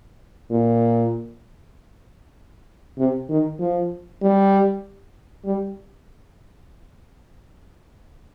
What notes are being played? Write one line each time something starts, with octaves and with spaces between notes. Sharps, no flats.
A#2
C3
D#3
F3
G3
G3